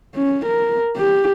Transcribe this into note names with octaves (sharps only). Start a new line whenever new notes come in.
C#4
A#4
G4